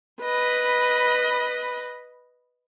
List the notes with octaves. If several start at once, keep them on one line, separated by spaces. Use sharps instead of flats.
B4 D#5 B5